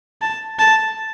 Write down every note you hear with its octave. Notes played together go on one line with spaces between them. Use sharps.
A5
A5